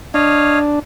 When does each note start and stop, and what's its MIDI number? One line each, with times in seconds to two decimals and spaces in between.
0.14 0.79 62
0.14 0.59 73
0.14 0.59 75
0.14 0.59 77